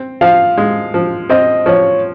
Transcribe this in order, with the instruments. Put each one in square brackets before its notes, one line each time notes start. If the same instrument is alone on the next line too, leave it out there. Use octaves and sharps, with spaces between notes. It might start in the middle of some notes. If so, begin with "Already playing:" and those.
Already playing: [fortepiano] C4
[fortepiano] F3 [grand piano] F5
[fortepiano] G#3
F3
[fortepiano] C4 [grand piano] D#5
[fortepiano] F3 [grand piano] C#5